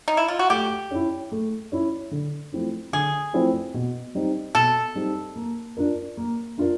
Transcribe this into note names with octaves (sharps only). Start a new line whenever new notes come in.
D#4
E4
F4
F#4
A3 G4
C#4 E4
A3
C#4 E4
D3
F3 A3 C4 E4
D3 G#4
F3 A3 C4 E4
B2
G3 C4 D#4
B2 A4
G3 C4 D#4
A#3
D4 F4 A#4
A#3
D4 F4 A#4